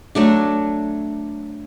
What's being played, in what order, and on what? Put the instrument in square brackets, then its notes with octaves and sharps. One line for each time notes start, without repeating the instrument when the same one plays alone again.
[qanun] F#3 A3 D4